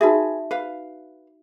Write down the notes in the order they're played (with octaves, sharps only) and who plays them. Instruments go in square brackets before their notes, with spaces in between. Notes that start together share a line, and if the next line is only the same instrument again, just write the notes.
[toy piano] D#4 F#4 E5 [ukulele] G#4 B4
[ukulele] B4 F5